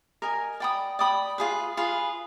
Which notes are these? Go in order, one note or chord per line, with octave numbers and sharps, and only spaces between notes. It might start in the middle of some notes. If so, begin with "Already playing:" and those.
A#4 D#5 G#5
D5 G5 B5 D#6
D5 G5 B5 D#6
F4 G#4 B4
F4 G#4 B4